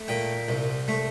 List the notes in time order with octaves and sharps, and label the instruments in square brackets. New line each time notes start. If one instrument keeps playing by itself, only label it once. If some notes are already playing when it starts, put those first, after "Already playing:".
Already playing: [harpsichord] A3
A#2 G5
C2
A3